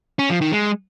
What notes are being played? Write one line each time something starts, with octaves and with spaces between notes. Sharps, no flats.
C#4
F3
D#3
G#3